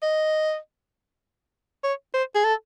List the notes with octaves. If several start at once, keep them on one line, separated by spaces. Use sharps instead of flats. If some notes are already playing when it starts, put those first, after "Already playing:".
D#5
C#5
C5
G#4
A4